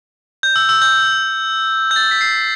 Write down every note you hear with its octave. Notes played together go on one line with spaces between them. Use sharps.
G6
E6
E6
G6
G6
A6
B6
C7